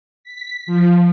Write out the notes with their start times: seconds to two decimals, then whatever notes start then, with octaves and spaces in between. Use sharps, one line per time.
0.24 B6
0.67 F3